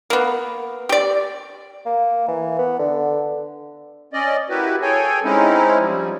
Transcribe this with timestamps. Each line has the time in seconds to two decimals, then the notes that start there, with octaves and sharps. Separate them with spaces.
0.10 A#3 B3
0.89 G4 D5
1.86 A#3
2.28 E3
2.59 B3
2.79 D3
4.13 C#4 D5 D#5
4.50 A#3 E4 F#4 G4 B4
4.82 G#4 A4 C#5 G5 G#5
5.24 G#3 C4 C#4 D#4 E4
5.80 F3 G3